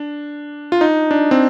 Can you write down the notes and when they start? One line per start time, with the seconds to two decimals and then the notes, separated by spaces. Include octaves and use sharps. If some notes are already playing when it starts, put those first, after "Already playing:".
Already playing: D4
0.72 F4
0.81 D#4
1.11 D4
1.31 C4